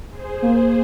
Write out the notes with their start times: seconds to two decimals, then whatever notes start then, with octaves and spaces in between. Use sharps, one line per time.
0.10 G#4 C5
0.42 A#3